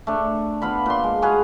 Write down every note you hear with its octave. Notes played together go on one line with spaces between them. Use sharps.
A3 D4
B3 F4 F5 B5
A#2 C6
G#3
F#4 G#4 B4 F5